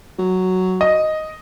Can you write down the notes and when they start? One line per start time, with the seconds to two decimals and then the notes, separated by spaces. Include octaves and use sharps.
0.19 F#3
0.81 D#5